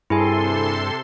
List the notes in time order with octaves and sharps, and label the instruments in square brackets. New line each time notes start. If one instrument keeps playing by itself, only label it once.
[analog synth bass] G2 [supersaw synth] C3 A4 C6 [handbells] E4 G#4 G#5